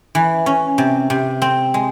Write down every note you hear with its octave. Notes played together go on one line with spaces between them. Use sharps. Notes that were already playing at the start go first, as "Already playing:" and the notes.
E3
C#4
C3
C3
C4
G#3